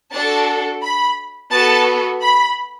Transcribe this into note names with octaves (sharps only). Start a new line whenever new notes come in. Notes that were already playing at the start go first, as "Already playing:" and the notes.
D4 F#4 A4 A5
B5
B3 F#4 A4 A5
B5